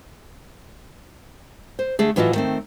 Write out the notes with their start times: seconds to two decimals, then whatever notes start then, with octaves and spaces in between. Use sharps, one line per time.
1.79 C5
1.99 D3 A3 G#4
2.16 A2 E3 F#3 F4 F#4 D#5
2.34 D#3 A3 C4